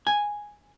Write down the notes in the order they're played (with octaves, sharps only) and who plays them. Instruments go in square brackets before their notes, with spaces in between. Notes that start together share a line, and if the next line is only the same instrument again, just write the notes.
[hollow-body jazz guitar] G#5